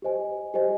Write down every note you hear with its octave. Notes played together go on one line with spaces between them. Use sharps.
G4 C5 D#5 G#5
G4 C5 D#5 G#5